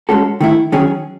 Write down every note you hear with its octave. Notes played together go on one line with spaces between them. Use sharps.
G#3 C#4 F#4 A4
D#3 A3 E4
D#3 F#3 C#4 G#4